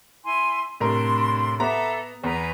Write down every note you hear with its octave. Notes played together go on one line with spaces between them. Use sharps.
E4 G#5 C6
A2 C3 D4 A#4 C6
B3 A4 E5 A#5 D6
E2 G#4 B4 A#5